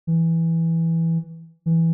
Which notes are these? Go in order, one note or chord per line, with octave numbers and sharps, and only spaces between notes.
E3
E3